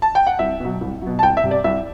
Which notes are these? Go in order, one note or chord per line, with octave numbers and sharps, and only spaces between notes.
A5
G5
F#5
C2 E5
B2 F#3
C2
B2 F#3
A5
C2 G5
E5
C3 G3
D5
C2 E5